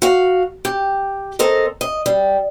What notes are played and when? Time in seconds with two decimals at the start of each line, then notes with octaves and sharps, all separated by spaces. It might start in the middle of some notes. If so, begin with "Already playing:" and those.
0.02 F#4 F5
0.65 G4
1.39 C4 A4 A#4 D#5
1.81 D#5
2.06 G3